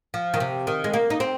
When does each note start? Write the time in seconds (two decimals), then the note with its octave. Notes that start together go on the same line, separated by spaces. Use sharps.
0.14 F3
0.34 D#3
0.40 C3
0.67 D#3
0.84 G#3
0.93 A#3
1.10 D#4
1.20 C4